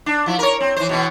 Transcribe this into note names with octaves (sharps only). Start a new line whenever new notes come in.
D4
F3 E4
A#4 C#5
C4
E3 C5
B2 E3 B3